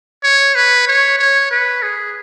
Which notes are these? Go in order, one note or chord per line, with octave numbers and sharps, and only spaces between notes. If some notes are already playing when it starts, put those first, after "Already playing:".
C#5
B4
C#5
C#5
B4
G#4